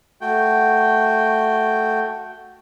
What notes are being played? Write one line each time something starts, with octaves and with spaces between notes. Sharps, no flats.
A3 F#4 G5